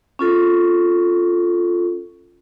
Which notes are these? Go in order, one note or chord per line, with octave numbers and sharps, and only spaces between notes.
C#4 F4 A4